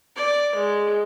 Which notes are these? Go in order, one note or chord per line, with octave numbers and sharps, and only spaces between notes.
D5
G#3